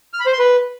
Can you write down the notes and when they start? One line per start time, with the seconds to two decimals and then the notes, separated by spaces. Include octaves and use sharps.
0.14 F6
0.20 B5
0.26 C5
0.33 C6
0.39 B4